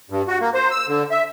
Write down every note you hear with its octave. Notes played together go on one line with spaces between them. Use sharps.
G2
F#4
A#3
C5
E6
D3
E5